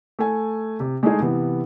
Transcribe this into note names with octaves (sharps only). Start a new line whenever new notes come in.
A3 A4 G#5
C3
G#3 A3 D#4 G#4
C3 E3 B3